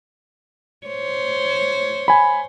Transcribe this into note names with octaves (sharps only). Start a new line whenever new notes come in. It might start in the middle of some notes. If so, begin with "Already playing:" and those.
C5 C#5
G#5 B5